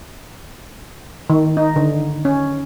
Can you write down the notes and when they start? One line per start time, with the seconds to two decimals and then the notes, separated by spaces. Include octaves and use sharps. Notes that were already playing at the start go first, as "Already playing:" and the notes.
1.30 D#3
1.57 D#4
1.76 D3
2.25 C#4